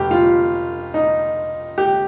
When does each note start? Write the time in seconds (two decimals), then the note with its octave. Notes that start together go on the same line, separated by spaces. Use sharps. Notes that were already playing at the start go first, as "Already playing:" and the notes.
Already playing: F1 G4
0.11 F4
0.94 D#4
1.78 G4